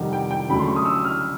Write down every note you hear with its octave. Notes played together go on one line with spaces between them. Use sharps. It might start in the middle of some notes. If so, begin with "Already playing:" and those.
Already playing: F2 C3 D#3 G3 F#5
G5
G5
D2 C#3 F#3 A3 B5
C6
C#6
D#6
E6
F6